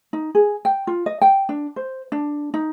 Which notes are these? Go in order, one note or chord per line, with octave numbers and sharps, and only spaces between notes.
D#4
G#4
G5
F4
D#5
G5
D4
C5
D4
D#4